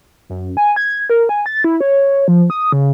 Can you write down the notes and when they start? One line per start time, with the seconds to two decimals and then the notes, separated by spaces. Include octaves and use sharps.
0.30 F#2
0.57 G#5
0.76 G#6
1.10 A#4
1.29 G#5
1.46 A6
1.64 E4
1.81 C#5
2.28 F3
2.50 D#6
2.72 C#3